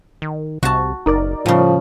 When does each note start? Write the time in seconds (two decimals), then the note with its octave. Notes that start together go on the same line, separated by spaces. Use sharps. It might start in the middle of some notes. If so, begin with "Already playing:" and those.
0.22 D#3
0.63 C2 C3 F#4 A5
1.06 F#1 D#4 A#4 D5
1.46 A2 C#3 F3 G3